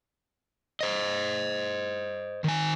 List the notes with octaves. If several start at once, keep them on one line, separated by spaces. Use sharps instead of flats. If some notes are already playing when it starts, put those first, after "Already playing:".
C5 D#5
D#3 G#5